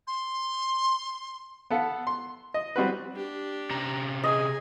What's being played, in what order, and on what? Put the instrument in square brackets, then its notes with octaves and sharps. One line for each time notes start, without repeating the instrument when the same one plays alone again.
[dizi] C6
[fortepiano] B3 A4 F5 F#5
C6
D#5
G3 C4 F#4 B4
[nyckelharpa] D4 G4
[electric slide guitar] C3 C#4 A#5
[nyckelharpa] G#4 [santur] D#5